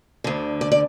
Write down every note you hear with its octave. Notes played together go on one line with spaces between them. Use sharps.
D2 D3
D5
D5